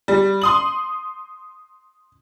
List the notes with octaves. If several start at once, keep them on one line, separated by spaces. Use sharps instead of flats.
G3
C6 D#6 F#7